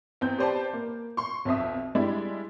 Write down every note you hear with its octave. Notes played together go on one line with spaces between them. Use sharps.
E2 C4 G6
G4 B4 C5 D5 A5
A#3
C6 C#6
B1 F2 B2 E5 D#6
G3 G#3 D4 E4